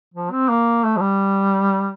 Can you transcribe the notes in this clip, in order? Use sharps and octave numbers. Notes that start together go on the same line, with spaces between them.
F3
C4
A#3
A3
F3
G3